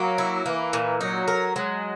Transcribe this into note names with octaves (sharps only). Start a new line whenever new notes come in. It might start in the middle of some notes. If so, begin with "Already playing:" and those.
Already playing: F#3 A#3
E4
E3 A#3
A#2
F#3 D#4
A#4
F#3 G#3